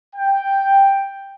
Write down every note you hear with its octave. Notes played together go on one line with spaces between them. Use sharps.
G5